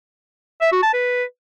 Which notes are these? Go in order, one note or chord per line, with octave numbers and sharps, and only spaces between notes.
E5
F#4
A5
B4